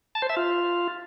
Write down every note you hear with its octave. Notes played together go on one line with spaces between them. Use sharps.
A5
C5
E5
F4